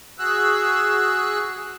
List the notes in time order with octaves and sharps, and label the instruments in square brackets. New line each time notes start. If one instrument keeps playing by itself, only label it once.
[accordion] F#4 G#4 E6 F#6